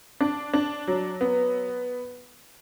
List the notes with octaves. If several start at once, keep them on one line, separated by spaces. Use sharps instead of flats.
D4
D4
F#3
B3